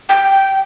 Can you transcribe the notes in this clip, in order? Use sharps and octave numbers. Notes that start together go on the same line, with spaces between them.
G5